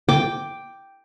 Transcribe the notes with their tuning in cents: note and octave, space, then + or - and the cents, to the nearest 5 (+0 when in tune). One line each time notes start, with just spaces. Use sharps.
G5 +0 D6 +0